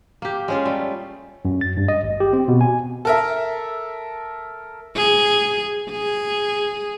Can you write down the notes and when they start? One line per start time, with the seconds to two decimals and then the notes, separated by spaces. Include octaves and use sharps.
0.22 A#3 G4
0.48 G#3 C#4 F4
0.65 G3 A3
1.45 F#2
1.61 A6
1.77 G2
1.88 D#5
2.04 G#1
2.20 G4
2.33 C4
2.48 B2
2.61 G#5
3.05 A4 A#4 E5
4.96 G#4
5.91 G#4